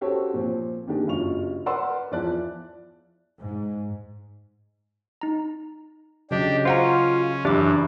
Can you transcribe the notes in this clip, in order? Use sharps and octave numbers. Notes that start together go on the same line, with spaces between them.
C#4 F#4 G4 A4 C5 C#5
A#2 F3 C4
D#3 A#3 D4 G4 G#4
F#1 G2 F#3 F4 C#6 F7
A#4 B4 D5 F#5 C6 E6
E2 F3 E4 D5 A5 F#6
G#2
D#4 A#5
C#3 F#3 D4 G4 D#5
C#4 F4 C5 F#5 A#5
F#2 E3 D4 E4 G4 E5 D6